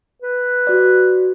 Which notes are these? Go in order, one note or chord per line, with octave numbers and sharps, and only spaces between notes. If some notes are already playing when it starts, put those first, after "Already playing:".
B4
F#4 D5